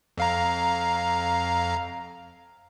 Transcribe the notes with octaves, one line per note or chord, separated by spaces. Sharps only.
F2 F5 A#5